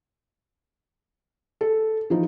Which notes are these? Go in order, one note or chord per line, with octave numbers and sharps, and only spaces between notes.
A4
E3 F3 D#4